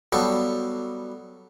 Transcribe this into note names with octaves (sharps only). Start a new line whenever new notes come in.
F#3 G3 B3 A4 F5